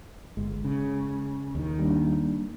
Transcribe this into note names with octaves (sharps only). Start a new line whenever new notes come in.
G1 G#3
C#3
D#2 D#3
G3 A#3 D4